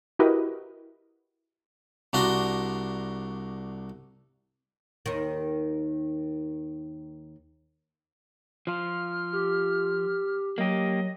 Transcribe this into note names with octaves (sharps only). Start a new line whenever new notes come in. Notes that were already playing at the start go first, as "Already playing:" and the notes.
E4 F#4 G4 A#4 B4 D#5
C2 D4 F#4 A#5 C6
D#2 D#3
F3 F4 F6
G4
F#3 A#3 G4 D#5